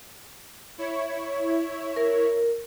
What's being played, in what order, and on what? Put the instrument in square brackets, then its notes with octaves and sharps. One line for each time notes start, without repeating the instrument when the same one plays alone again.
[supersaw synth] E4 C#5
[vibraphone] A#4